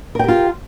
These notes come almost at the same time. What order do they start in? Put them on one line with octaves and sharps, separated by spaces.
A#4 G5 G4 F4